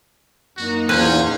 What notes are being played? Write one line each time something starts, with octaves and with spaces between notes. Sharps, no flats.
F#2 A#3 D#4 F#4
E2 A#2 C#4 B4 C5